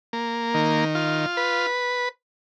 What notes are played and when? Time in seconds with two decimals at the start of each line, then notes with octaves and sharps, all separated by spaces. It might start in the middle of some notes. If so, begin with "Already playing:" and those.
0.13 A#3
0.54 D#3
0.95 F4
1.37 B4